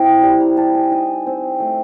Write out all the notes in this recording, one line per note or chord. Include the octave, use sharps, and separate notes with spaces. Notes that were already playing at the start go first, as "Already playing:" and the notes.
Already playing: C4 E4 G5
G3 A5
A#5
G3 A5
G#5
D#4 G#5
C4
A3